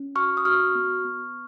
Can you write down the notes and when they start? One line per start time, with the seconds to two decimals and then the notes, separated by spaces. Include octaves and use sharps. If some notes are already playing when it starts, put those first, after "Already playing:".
Already playing: C#4
0.15 F#4 C#6 F6
0.37 D#6
0.45 F#4 C#6 F6
0.75 B3
1.05 B3